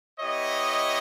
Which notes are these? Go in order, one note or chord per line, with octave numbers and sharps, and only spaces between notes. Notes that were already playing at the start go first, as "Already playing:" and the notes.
B3 E4 G4 C#5 D#5